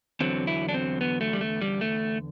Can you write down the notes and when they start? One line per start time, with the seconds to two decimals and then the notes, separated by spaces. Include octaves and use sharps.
0.20 E2 D3 F#3 C4
0.47 E4
0.69 D4
0.74 C4
1.01 B3
1.21 A3
1.33 G3
1.41 A3
1.62 G3
1.81 A3